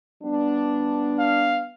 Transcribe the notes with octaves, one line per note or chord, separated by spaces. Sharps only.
G3 B3 D4
F5